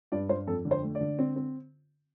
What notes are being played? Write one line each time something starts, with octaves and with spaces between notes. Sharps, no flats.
G2 D5
G2 C5
F2 A4
D3
C5
A3
D5
D3
C4
C4